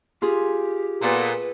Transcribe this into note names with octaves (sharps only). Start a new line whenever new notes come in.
F4 G4 G#4
A#2 B3 A4 B4